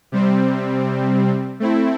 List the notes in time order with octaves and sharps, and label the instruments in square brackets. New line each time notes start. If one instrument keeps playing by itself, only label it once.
[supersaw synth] C3 G3 C4
A3 C4 E4